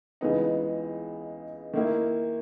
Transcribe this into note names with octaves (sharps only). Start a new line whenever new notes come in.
C#2 C#3 E3 B3 D#4
D#3 A#3 E4